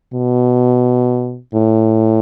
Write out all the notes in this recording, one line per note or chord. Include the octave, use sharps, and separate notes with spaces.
B2
A2